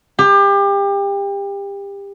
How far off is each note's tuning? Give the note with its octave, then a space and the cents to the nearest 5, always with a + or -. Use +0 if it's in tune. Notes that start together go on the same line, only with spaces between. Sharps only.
G4 +30